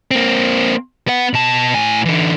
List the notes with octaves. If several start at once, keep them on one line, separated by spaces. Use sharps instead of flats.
A#3 C4
B3 F#5
B2 A5
A2 G#5
D3 E3